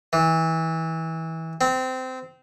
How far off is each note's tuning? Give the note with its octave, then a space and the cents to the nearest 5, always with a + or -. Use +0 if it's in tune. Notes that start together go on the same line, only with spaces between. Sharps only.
E3 -25
C4 -20